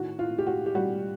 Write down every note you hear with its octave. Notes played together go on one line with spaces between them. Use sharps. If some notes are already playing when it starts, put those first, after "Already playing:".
Already playing: A2 D#3 F#4
A2 F4
G4
A2 F#4
G4
G3 F#4